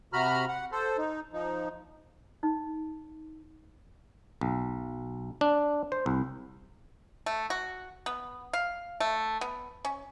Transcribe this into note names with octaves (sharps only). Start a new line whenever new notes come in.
C3 F#4 A#5 B5 F6
F#5
A4 C5
D#4
F3 D#4
D#4
B1
D4
C5
C2
A3
F#4
B3
F5
A3
B3
C#4